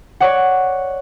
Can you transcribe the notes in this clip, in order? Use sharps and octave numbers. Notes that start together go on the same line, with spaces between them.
C#5 D5 F#5